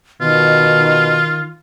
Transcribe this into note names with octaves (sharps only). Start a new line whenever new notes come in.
B2 D#3 F4